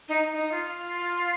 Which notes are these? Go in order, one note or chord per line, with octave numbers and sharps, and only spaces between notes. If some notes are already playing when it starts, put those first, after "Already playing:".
D#4
D#4
F4